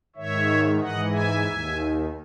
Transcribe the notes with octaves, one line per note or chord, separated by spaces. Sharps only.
G#2 D#3 C#5 E5
G#2 E3 D#5 F#5
E5 G#5
D#2 D#3